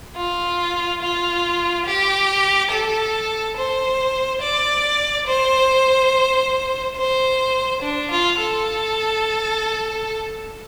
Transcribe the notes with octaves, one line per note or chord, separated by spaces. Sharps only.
F4
F4
G4
A4
C5
D5
C5
C5
D4
F4
A4